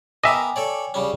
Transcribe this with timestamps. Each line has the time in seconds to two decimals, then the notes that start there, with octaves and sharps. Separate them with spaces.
0.24 B3 A#4 D#5 E5 G5 G#5 D6
0.56 A4 C#5 D5
0.94 C#3 G3 C#4